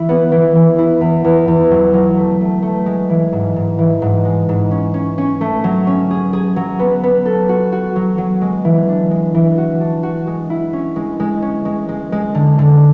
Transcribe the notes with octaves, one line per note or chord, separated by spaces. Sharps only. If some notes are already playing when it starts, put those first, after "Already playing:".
Already playing: E3 E4
B3
E3
E3
E4
E2
E2
E2
F#3
F#3
A3
A3
A3
G#3
E3
G#2
G#2
E3
G#2
G#3
G#2
C#4
C#4
C#4
A3
F#3
C#4
G#4
G#4
F#3
B3
B3
A4
F#4
F#4
F#3
F#3
G#3
E3
D4
G#3
E3
F#4
D4
F#4
G#3
E4
C#4
G#3
G#3
C#4
G#3
G#3
G#3
D3
D3